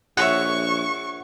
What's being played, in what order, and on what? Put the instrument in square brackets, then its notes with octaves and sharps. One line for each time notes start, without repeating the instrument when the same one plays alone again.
[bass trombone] A#1 [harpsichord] G#4 C#5 E5 [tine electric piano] F#5 [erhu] C#6